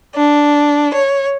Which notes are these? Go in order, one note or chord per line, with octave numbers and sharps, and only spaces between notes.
D4
C#5